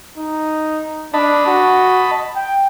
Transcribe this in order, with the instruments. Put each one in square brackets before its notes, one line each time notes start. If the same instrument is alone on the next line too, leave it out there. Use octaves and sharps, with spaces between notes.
[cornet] D#4
[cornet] D4 [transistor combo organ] D#5 A5 B5
[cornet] F#4
G5